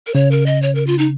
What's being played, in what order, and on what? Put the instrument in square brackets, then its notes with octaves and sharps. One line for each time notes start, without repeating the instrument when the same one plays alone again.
[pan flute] A#4
[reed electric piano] C#3 [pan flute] C#5
[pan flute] A#4
D#5
C#5
A#4
F4
D#4